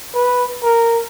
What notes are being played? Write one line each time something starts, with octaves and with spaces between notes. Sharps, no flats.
B4
A#4